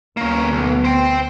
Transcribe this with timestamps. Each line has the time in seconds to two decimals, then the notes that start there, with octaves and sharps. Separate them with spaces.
0.17 D2 A#3 B3 C#4
0.52 B1
0.84 C5 G5